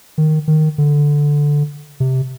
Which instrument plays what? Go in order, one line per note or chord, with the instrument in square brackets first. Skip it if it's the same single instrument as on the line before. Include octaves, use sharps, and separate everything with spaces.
[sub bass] D#3
D#3
D3
C3